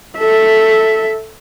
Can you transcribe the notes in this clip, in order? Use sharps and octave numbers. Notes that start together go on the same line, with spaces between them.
A4 E5